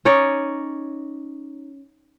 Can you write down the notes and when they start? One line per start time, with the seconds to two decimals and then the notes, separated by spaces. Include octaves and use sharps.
0.05 C#4 D#4 C#5 D5